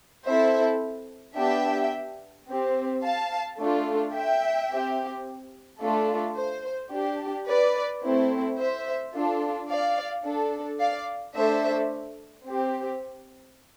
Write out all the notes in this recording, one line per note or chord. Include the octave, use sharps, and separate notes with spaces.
C4 E4 A4 C5 E5
B3 D4 G4 E5 G5
C4 G4
F5 A5
A3 D4 F4 A4
E5 G5
C4 G4
A3 D4 F4 A4
C5
D4 G4
B4 D5
A3 C4 E4
C5 E5
D4 F4 A4
D5 F5
D4 A4
D5 F5
A3 D4 A4 C5 E5
C4 G4